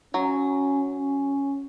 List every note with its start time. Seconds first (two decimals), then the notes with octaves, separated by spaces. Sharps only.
0.14 F#3 C#4
0.87 C#4